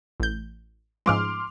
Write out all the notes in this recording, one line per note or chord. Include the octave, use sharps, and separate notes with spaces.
A1 G6
G#2 F3 G#3 C6 D6 F6